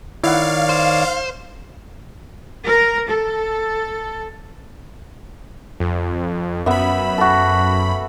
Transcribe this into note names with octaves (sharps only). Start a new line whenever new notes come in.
D#3 E4 C#5 D5 F5 F#5
C5
A#4
A4
F2
F#2 B3 E5 B5
F#4 A4